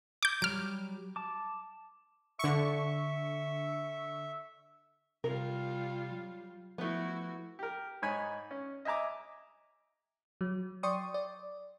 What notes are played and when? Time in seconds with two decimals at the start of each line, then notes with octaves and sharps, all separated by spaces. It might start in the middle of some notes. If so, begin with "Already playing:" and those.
0.23 D6 G6
0.42 F#3 G3 F6 D7
1.16 A5 D6
2.39 D3 E5 C#6
5.24 C3 G3 F4 A#4
6.12 F#3
6.78 F3 A3 B3 E4 F#4
7.59 G4 A#4
8.02 G#2 D#4 C#5 G#5 B5
8.51 C#4
8.85 D#5 E5 G#5 A#5 D6
10.41 F#3
10.83 D5 G5 C6 C#6 D#6
11.14 D5